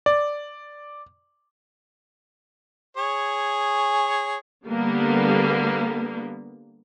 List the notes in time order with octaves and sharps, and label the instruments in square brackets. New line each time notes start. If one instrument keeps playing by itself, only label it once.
[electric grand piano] D5
[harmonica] G#4 C#5
[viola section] D3 G3 A#3 B3